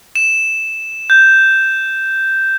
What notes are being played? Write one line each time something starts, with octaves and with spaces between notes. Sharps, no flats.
E7
G6